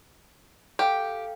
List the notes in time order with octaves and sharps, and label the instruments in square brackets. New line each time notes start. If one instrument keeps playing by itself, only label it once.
[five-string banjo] G4 [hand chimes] A4 F5 G5